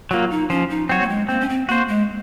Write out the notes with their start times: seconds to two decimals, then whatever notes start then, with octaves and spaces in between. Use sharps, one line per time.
0.11 F#3 A#3 F4
0.31 D#4
0.50 F3 C#4
0.70 D#4
0.89 F#3 C4 F#4 C#5
1.02 A#3
1.09 G#3
1.29 A#3 C4
1.40 C#4
1.49 C4
1.69 A#3 F#4 C5
1.88 G#3